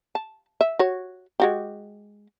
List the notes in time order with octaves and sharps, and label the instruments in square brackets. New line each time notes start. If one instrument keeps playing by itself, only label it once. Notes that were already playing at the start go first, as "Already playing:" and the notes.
[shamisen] A5
E5
F#4 C#5
G#3 F#4 G4